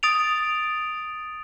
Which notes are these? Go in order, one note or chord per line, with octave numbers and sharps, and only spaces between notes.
D#6 A6 D7 F7